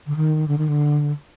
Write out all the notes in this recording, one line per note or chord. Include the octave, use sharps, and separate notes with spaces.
D3
D#3
D3
D#3
D3